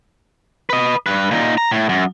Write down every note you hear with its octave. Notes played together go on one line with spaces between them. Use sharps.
B4 D#5
G2 B4
A#2 D#4
A#5
A2
F#2